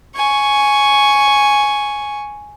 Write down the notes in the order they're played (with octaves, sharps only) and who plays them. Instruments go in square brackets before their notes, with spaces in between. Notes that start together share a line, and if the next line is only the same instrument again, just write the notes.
[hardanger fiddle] G#5 C#6